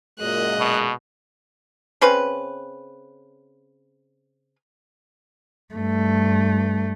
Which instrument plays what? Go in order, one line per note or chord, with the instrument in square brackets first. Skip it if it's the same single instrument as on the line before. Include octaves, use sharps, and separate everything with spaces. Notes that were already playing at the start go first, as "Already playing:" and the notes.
[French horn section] F#2 A#2 [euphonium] G#3 [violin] D#5 F#6
[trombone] B2
[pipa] C#3 C4 C#4 B4
[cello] G2 A3